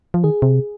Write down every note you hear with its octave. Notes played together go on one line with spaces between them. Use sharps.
F3
D#3 G#4
C3